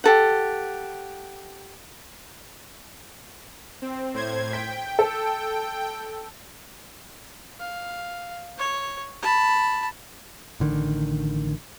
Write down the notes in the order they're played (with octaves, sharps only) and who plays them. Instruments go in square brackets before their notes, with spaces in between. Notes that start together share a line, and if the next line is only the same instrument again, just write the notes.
[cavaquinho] G4 A4 F#5
[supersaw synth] C4
A2 C5 G#6
[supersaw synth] G5 [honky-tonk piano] B6
[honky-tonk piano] A4
[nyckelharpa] F5
C#5
A5 B5
[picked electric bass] A1 D3 D#3